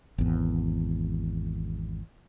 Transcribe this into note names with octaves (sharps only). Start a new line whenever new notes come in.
G#1 E2